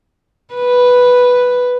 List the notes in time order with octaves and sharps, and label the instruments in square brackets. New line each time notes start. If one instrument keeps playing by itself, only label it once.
[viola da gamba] B4